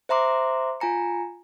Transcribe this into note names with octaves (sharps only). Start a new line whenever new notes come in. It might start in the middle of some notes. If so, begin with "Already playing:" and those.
C5 E5 A#5 C6 D6
F4 G#5 A#5 C#7